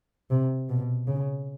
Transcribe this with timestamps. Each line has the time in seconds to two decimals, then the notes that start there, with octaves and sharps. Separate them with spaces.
0.31 C3
0.69 B2
1.08 C#3